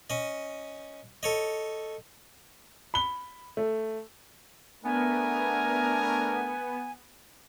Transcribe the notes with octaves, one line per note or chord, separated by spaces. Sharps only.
C#4 D#5
A4 C#5 D#5
B5 G7
A3
A3 B3 D4 A#4 G#5